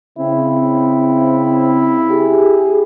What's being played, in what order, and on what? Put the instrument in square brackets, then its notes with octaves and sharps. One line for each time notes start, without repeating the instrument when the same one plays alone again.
[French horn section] C#3 C4 [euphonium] E4
[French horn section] G4 G#4